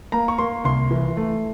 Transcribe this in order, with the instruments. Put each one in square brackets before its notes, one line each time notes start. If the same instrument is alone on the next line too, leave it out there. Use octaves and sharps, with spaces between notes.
[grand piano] A#3 A#5
C#6
A#3 C6
C2 C6
E3
A3